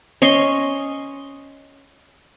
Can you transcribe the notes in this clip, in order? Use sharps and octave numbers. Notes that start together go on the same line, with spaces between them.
C#4 D#5 C6 C#6